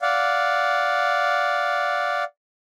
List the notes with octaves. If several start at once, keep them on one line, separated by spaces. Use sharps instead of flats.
D5 F5 F#5